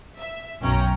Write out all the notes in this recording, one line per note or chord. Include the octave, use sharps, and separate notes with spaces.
E5
B1 F#2 C#4 G5 A#5